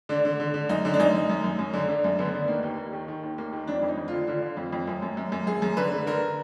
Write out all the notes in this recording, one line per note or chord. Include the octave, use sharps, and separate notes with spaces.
D3 D4
D3
D3
D3
F#2 D#4
D3
D4
F#2 D#4
F#2
F#2
F#2
F#2
D3
D3 D4
F#2
D3 B3
D3
D#3 A#3
D#2
D#2
D#3
D#3
D#2
D#2 A#3
D#3
F2 D4
F2
D#4
F2
D3 F4
D3 F4
D3
F2
F2
F#2
F#2
F#2
F#2
F#2 G#4
F#2
D3 B4
D3
D3 A#4